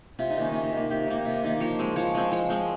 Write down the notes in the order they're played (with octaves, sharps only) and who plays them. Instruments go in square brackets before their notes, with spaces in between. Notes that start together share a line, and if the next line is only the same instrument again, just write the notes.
[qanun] C3 F4
D#4
D#3 A#3 C#4
C3 D#4
D#3 A#3
C3 G4
D#3 A#3
C3
D#3 A#3
F3 C#5
G#3 C4
F3 C#5
G#3 C4
F3 C#5
G#3 C4